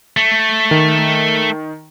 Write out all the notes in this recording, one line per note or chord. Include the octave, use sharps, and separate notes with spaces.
A3
D#3